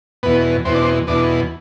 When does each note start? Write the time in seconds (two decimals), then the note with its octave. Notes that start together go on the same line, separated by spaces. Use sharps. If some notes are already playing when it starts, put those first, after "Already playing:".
0.23 E2 B2 B3
0.65 E2 B2 C4
0.74 D4
0.82 C4
1.07 E2 B2 D4